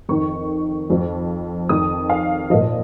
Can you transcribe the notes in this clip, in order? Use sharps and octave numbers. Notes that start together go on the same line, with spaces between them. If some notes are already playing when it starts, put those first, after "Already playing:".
F2 D#3 C#6
F2 F3
F2 D#3 D#6
F5
A#2 F3 D#5